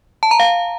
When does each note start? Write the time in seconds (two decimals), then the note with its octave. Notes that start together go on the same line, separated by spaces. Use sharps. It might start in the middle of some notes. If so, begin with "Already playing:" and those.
0.23 A5
0.31 A#5
0.40 F5